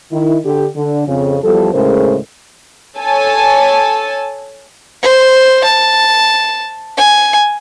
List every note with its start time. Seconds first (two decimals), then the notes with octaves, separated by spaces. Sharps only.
0.11 D#3 E4
0.45 D3 G4
0.76 D3
1.07 F2 C#3
1.43 E2 F3 G3 A4
1.74 D2 A2 C#3 G#3 A#4 C5
2.97 A4 C#5 G#5 A5
5.02 C5
5.64 A5
6.97 G#5